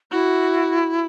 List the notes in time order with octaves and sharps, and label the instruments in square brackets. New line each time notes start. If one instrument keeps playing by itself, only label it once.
[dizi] E4 [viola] F#4